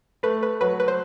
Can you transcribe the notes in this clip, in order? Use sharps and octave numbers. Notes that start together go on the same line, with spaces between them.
A3 B4
B4
F#3 B4
B4
C5